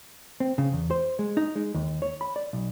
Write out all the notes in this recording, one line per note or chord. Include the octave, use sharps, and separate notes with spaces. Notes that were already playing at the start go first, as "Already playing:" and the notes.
C4
C#3
E2
C5
G#3
D#4
G#3
D#2
C#5
B5
D5
B1